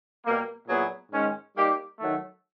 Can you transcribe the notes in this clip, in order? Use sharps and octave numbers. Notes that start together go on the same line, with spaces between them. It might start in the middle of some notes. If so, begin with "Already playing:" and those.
B2 G3 A#3
A#2 F#3 B3 E4 G#4
G#2 D#3 G#3 C#4
G3 A#3 D#4 G4
D#3 F#3 A3